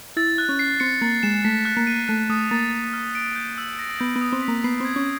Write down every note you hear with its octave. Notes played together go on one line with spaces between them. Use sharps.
E4 A6
F#6
C#4
C7
C4 C#7
A#3 A6
G#3 E7
A3 B6
F#6
A#3
D#7
A3 F#6
A3 D#6
A#3 A6
A6
F6
D7
G6
E6
A#6
B3 G6
B3
D#6
C4
B6
A#3
B3 C7
C4 G#6
C#4